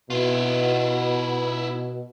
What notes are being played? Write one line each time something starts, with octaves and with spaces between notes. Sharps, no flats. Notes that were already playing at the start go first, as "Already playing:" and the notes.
B2 E4 F4